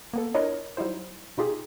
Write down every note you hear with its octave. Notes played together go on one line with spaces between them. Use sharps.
A#3 B3 A4
D4 E4 F4 A#4 C#5 D#5
F#3 G3 D#4 E4 C5
B2 D#4 F4 G4 G#4